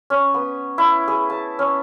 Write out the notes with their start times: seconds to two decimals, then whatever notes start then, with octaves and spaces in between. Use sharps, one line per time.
0.10 C#4
0.34 B3
0.78 E4
1.08 G#4
1.30 A5
1.59 C#4